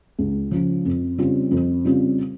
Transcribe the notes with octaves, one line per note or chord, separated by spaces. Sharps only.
C#2
C#3 F3
F2
C#3 G3 C4 F4
F2
C#3 G3 C4 F4